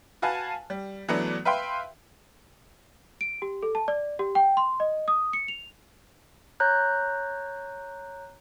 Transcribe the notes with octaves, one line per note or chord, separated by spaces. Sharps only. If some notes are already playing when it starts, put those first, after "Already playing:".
F#4 B4 F5 G#5 A5
G3
E3 F#3 A3 B3 D4
B4 E5 F5 G5 C6
D7
G4
A4
A5
D5
G4
G5
C6
D#5
D#6
C#7
F7
C#5 A#5 F#6 G6